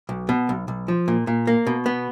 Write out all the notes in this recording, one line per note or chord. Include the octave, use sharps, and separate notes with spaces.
B1
B2
B1
B1
F3
A#2
A#2
A#3
B2
B3